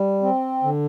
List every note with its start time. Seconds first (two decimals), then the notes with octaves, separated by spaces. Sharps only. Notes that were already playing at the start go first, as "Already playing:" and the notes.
Already playing: G3
0.22 C4
0.63 D3